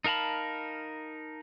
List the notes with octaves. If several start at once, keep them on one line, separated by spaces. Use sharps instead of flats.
D#4 A#4 F5 A5 B5